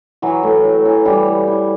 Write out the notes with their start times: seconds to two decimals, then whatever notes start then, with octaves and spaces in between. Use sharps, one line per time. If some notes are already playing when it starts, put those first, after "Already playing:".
0.22 E3 F#3 F#4
0.43 A2
0.65 A2
0.85 E3
1.05 E3 G3 G4
1.27 A2
1.48 E3